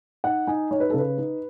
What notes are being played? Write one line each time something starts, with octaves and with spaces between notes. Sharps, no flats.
D#4 F#5
D#4 G#5
D#4 C#5
B4
A4
C#3 B4
D#4